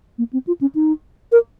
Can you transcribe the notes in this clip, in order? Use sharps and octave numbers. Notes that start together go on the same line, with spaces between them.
A#3
C4
F4
C#4
D#4
A#4